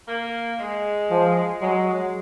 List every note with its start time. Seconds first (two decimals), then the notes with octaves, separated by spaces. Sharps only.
0.08 A#3
0.59 G#3
1.11 F3
1.62 F#3 G#3
1.88 G#3